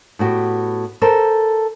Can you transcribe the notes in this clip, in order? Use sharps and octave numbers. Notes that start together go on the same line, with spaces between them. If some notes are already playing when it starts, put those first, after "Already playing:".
A2 B3 F#4 G4
A4 A#4 C5